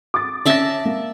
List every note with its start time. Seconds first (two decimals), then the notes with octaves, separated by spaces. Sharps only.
0.14 D6 D#6 A6
0.46 C#4 D5 E5 A5 A#6
0.85 A#3